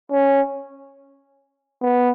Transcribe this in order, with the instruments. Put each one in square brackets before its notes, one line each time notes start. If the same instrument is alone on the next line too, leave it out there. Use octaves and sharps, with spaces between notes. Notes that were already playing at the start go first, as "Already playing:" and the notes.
[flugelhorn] C#4
B3